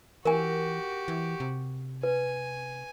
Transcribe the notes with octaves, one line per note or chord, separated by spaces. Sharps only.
E3 F#4 G4 A#4 G#5
E3
C3
B4 G#5